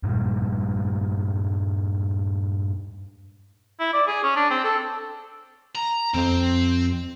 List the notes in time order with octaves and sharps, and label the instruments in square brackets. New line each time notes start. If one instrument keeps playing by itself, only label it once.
[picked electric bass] G2 A#2 G3 G#3
[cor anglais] E4
D5
G#4
C#4
D4
C4
A4
[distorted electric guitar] A#5
[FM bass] F2 [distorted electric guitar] C4